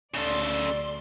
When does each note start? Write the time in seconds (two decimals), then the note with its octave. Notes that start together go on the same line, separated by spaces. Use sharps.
0.15 D2 C#3 A4 D5 C6